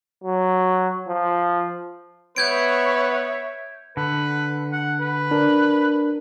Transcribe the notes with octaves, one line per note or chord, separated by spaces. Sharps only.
F#3
F3
B3 B4 C#5 E5 G6 G#6 D7
D3 B4
F#5
B4
D4 A#4